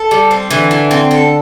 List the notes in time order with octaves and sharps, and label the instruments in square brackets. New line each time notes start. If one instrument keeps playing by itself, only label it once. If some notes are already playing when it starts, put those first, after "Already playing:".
Already playing: [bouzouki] A4
G3
C4
[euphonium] D3 [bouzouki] E3
[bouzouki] E3
C4
A4